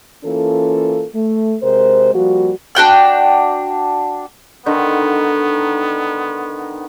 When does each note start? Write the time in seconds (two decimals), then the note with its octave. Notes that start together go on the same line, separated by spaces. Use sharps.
0.24 E3 A#3 C#4 F4 A4
1.15 A3
1.62 C3 G#3 A#4 C5
2.14 F3 G3 A#3 F#4
2.75 D4 F#4 G5 F#6
4.66 D3 D#3 B3 D#4